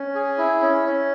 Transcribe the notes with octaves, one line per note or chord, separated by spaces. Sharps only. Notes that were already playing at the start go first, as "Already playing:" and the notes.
Already playing: C#4
G#4
E4
C#4
C#4